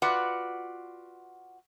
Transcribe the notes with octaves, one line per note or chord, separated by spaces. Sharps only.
F4 F#4 B4 D5 F#5